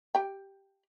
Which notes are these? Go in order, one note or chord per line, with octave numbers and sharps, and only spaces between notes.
G4 G5